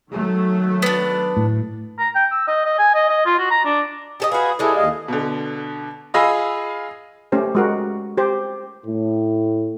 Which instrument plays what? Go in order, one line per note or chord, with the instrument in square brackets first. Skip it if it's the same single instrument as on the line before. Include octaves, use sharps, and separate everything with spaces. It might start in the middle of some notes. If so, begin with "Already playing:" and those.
[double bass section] D#3 F#3 A3
[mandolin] B3 D4
[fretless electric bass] A2
[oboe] A#5
G5
E6
D#5
D#5
G#5
D#5
D#5
F4
F#4
A#5
D4
[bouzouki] G4 A4 D#5
[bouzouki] F#4 G#4 [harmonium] B4 F5
[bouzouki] G3 G#3 [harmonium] E4 A4
[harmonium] D#2 D#5 F5
[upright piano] B2 D3
F4 G#4 D#5 G#5 B5 E6
[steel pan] A3 C#4 G4 C5
G#3 F#4 A#4
G4 C5
[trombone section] A2